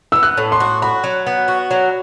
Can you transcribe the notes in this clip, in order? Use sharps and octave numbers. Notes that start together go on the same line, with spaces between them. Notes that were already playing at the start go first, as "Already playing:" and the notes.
B3 E6
F#6
A2
C6
F#4
F#4 B5
F#3
B3
F#4
F#3